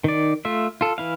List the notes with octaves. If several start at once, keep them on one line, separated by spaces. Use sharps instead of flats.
D#3 D5
A3 F4 E5
F4 A4
E3 E4 F5